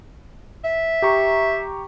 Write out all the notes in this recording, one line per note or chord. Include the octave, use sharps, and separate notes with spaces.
E5
G4 A#5 C#6